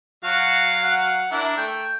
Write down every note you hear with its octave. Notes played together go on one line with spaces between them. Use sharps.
F#3 F#4 F5
F#5
D4 E4 A#4
A3 G5